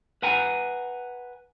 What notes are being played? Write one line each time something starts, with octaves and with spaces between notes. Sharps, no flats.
B4 F#5 G#5 A#5